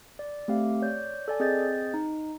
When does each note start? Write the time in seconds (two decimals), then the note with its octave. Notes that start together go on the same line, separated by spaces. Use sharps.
0.19 D5
0.48 A3 C4 G4 F5
0.82 C#5 D5 G6
1.28 A4 D5 G#5
1.40 C4 G#4 D#5 G6 A6
1.94 D#4